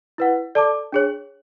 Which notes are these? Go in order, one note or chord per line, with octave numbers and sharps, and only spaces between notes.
E4 B4 F#5
A4 D5 A5 D6
D4 G#4 C#5